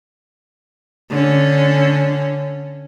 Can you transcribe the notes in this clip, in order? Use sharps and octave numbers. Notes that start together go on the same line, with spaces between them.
D3 C#4